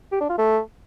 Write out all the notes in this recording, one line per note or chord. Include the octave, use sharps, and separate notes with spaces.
G4
D4
F4
A3